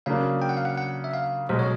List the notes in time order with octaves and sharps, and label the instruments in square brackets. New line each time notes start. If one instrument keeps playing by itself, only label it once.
[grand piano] C#3 F#3 A#3 D4 [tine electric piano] F5
[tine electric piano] G5
F#5
F5
F#5
F#5
E5
F5
[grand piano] B1 B2 G#3 [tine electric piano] C5
[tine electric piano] C#5